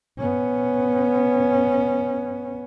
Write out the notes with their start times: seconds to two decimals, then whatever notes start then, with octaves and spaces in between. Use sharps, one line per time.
0.19 B3 C#4